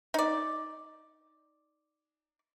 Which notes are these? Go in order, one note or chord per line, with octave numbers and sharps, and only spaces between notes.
D#4 D5